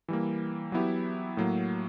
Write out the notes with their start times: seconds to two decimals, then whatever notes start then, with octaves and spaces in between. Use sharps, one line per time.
0.08 E3 G3 A#3
0.72 F#3 B3 E4 G4
1.37 A2 F#3 A#3